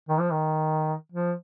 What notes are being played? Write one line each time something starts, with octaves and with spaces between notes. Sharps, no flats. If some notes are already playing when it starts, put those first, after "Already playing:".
D#3
F3
D#3
F3